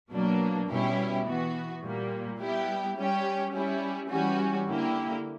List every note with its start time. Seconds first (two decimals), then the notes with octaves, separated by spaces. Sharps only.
0.12 B2 F#3 A#3 D4
0.69 B2 G3 C#4 E4 G4
1.26 E3 B3 F#4
1.83 A#2 G3 A#3
2.39 G3 B3 E4 G4
2.96 G3 C#4 G4
3.53 G3 C#4 E4
4.10 E3 G3 C#4 F#4
4.67 D3 A#3 E4 G4